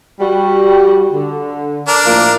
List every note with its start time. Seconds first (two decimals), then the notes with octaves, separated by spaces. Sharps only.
0.20 G3 F#4
1.12 D3
1.88 D4 A#4
2.06 A2 F3 A#3